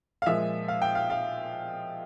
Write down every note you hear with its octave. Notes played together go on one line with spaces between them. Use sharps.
F5
A#2 F3 G#3 E5
F5
G5
F5
F5